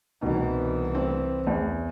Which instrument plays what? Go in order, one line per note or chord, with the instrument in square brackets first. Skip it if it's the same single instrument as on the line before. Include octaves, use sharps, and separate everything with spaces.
[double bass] C2 E3 [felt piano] B2 D#4
[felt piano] C4
E2